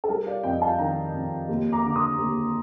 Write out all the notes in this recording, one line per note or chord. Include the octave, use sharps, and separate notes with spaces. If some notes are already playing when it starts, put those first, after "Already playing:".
A4
G3 A#4
D5 F5
F2 D#5 G5
F5 A5
D#3 G5 A#5
F2
D#2
A#5 D6
D3 D6
C6 D#6
D#2